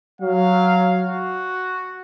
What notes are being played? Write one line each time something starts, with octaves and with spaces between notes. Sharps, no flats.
F#3 F5
F#4